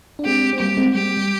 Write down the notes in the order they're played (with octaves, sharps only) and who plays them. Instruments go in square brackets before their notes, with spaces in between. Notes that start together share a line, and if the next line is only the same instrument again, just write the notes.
[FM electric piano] D4
[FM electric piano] G#3 C4 [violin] G4
[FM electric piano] C4
[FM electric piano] G3 A#3 [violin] G4
[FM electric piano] G#3 C4
[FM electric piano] G3 [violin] G4
[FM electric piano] G3